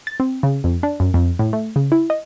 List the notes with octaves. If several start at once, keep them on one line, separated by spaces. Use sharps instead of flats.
A6
C4
C#3
F2
D4
F#2
F2
A2
A3
C#3
E4
D#5